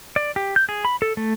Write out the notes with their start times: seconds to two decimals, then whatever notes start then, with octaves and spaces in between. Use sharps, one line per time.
0.16 D5
0.36 G4
0.56 G6
0.69 G#4
0.85 B5
1.02 A4
1.17 A3